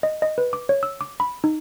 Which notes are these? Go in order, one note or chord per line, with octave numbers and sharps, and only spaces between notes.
D#5
D#5
B4
D6
C#5
E6
D6
B5
D#4